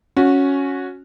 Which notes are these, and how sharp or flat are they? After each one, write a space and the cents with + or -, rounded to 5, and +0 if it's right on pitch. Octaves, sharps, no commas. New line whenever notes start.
C#4 +0 F#4 -15